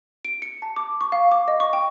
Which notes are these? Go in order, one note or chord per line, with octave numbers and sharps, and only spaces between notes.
D7
C#7
A5
D6
C#6
F5
D6
D#5
C#6
G5